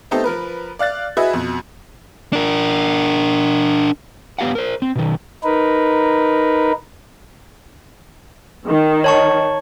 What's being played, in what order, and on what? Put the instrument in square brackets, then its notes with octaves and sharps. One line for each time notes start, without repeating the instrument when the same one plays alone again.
[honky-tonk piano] A3 B3 C4 D#4 G4 A4
F3 A#4 B4
D5 F5 F#6 A6
E4 F#4 G#4 B4 D#5 E5
F2 B2
[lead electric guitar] D4 A#4
[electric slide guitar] B3 G4 F5 F#5
A#4 C5
C4
B2 D#3
[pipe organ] D#4 A#4 B4
[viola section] D#3
[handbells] C#5 A5 C#6